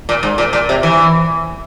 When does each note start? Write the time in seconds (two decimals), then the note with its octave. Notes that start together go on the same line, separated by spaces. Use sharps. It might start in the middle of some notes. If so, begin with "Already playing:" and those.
0.09 A#2
0.23 G#2
0.38 A#2
0.53 A#2
0.69 C3
0.83 E3